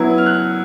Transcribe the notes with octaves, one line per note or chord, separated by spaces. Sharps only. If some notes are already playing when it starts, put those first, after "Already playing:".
Already playing: F#3 B3 E4
F6
F#6